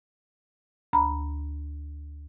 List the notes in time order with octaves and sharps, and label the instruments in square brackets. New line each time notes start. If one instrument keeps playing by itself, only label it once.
[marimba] D2 A#5 B5